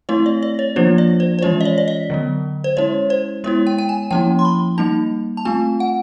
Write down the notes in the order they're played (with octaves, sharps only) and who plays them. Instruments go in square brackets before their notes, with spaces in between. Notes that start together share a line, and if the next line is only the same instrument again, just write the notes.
[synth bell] A3 C4 E4 C#5
D5
D5
C#5
F3 A#3 D4 F4 C5
D5
C5
C5
E3 G#3 C#4 F4 C#5
D#5
D5
D5
D#5
D3 F#3 B3
C5
G#3 C#4 E4 C#5
C5
G#3 B3 E4 C#5
G5
G5
G#5
F3 A#3 C#4 E4 G5
C6
B5
G3 A#3 D#4 A5
A5
A3 C4 F4 G#5
F#5